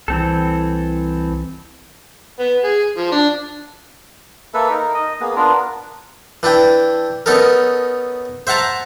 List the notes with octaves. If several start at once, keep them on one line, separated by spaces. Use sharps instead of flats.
C2 E3 C4 A4
B3
G#4
F3
D4
A#3 A4 B4 E5
D#4 A#4
D#5
A#3 B3 G#4
B3 D4 F4 A#4
E3 D4 E4 G5
B3 C#4 D#4 A4 A#4
C5 E5 F#5 A5 A#5